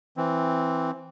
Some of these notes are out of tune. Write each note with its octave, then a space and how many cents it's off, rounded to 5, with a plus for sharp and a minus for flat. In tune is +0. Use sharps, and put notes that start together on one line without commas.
E3 +0 C4 +0